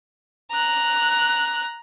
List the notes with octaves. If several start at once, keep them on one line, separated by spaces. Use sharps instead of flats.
A#5 F#6